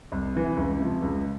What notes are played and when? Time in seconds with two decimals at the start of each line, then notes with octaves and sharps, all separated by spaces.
0.12 C2
0.35 C3 E3
0.57 C#2
0.79 C3 F3
1.02 C#2